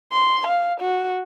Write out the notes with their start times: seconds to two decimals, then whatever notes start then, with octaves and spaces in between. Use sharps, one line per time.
0.12 C6
0.47 F5
0.80 F#4